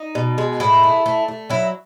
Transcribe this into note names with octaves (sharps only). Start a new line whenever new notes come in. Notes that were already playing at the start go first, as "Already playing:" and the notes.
Already playing: D#4
B2
G#3
A2 E4
A3
A3
A3
F#3 E4